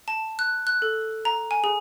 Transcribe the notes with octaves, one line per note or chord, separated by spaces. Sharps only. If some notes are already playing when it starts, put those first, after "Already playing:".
A5
F#6
F#6
A4
A#5
G#5
G#4